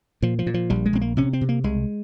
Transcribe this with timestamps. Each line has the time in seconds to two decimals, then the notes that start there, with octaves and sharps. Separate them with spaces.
0.22 A#2 F3
0.39 F3
0.47 A#2
0.54 F3
0.70 A#1 G3
0.86 G#3
0.93 A#1 C4
1.01 A#3
1.17 C3 C#4
1.33 C4
1.41 C3
1.49 A#3
1.64 C2 G#3